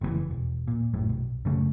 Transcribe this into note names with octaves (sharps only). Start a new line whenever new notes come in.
F#1 C3 E3
E1
A#2
A#1 F#2 A2
B1
F#2 C#3 A3